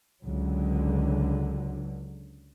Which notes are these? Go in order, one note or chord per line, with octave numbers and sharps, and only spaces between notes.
C#2 D3 F#3